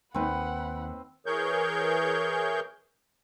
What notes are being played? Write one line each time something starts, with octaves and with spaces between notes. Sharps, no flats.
D#2 C4 D#4 B4 F#5 B5
E3 G#4 A#4 C#5 C#6 G6